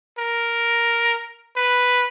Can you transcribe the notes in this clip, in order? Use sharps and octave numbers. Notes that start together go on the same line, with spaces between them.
A#4
B4